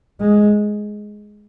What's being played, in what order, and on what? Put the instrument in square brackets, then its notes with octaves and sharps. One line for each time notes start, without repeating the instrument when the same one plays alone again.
[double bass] G#3